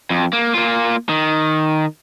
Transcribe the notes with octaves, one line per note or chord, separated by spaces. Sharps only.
F2
A#3
A#3 F4
D#3